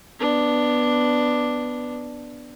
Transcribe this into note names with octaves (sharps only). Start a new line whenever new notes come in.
B3 D4